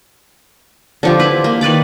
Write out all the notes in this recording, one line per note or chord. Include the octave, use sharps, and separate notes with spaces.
D3 F3 G4
E4 B4
A#3
D#3 B4 D5 D6